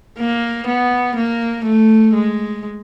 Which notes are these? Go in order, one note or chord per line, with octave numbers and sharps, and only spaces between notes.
A#3
B3
A#3
A3
G#3